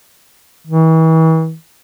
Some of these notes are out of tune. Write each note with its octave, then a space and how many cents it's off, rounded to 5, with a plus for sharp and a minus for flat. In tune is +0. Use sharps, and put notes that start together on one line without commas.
E3 -40